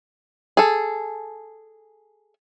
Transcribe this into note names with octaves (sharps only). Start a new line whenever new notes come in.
G#4 A4